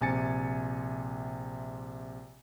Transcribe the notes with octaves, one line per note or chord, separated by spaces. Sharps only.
A#1 C3 G#5 A6 C#7